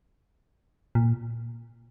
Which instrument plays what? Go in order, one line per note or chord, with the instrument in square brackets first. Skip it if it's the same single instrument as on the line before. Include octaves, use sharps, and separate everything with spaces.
[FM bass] A#2